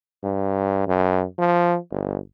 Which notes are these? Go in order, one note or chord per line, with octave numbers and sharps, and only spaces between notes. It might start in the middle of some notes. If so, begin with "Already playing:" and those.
G2
F#2
F3
G1